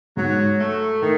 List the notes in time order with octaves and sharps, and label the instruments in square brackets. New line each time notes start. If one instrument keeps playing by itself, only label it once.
[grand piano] G#2 [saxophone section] F#3
[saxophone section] A3
[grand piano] A2 [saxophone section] D#3